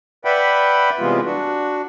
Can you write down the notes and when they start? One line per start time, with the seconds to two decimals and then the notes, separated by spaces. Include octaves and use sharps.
0.25 B4 D5 E5 F#5 G5 B5
0.99 C3 E3 G3 G#3 B3 F4
1.25 D4 F#4